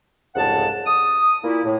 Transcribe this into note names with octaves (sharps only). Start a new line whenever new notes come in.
C2 F2 G#2 C#3 F#5 A5
D#6
A#2 A#3 E4
A2